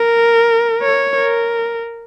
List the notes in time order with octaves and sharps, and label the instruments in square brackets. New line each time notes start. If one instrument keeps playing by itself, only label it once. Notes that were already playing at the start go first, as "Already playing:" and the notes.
Already playing: [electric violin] A#4
C#5
A#4